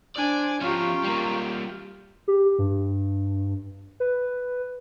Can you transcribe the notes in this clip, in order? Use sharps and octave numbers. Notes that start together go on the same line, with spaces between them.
D4 C5 D5 G#5
F3 C#4 F4 G4 F5 A#5 C#6
G3 A#3
G4
G2
B4